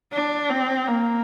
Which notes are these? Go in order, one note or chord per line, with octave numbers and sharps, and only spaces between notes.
D4
C4
A#3